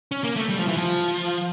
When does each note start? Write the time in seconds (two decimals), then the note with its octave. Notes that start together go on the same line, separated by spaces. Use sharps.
0.11 C#4
0.24 A#3
0.36 A3
0.49 G3
0.59 F3
0.68 E3
0.77 F3